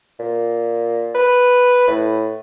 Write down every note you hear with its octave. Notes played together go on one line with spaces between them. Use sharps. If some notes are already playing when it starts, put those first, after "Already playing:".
A#2
B4
A2